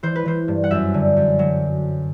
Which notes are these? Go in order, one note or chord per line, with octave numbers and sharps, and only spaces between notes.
E3 C5
B4
E3 C5
G2
F#5
F#2 E5
D3
F#2
F#3